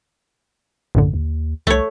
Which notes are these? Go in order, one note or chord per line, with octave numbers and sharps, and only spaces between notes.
A#1 F#2 A2 D3
D#2
C2 A3 C#5